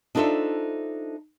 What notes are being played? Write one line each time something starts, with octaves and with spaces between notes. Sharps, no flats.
D4 D#4 F4 A4 C5 E5